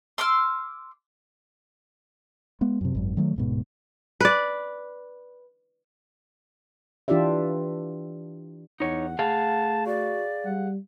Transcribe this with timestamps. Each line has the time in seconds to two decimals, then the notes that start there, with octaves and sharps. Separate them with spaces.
0.18 C6 D6 E6 F6
2.61 G#3 B3
2.81 F#2 C3
2.95 G#1 F#2
3.17 D#3 F#3 A3
3.36 D1 G#2 B2
4.20 B4 D5
7.08 E3 D4 F4 G4 D5 E5
8.80 E2 D#4 C#5 F#5
9.19 A3 G#4 F5 A5
9.86 F#4 D5
10.45 G3 F#5